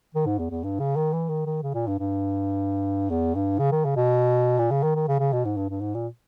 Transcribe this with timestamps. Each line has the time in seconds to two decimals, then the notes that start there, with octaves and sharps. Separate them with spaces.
0.15 D#3
0.26 G#2
0.39 E2
0.50 E2
0.64 G2
0.80 C#3
0.96 D#3
1.13 E3
1.29 D#3
1.46 D#3
1.62 C#3
1.74 A#2
1.87 G2
1.99 G2
3.10 E2
3.35 G2
3.59 C#3
3.72 D#3
3.85 C#3
3.96 B2
4.59 A#2
4.71 C#3
4.83 D#3
4.95 D#3
5.08 C#3
5.19 C#3
5.33 B2
5.45 G#2
5.57 G2
5.70 G2
5.81 G#2
5.95 A#2